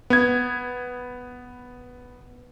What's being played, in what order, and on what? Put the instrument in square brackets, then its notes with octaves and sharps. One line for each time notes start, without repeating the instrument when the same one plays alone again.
[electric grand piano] B3 G#6